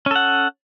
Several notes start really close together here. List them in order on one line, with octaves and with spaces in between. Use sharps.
C#4 A4 F#5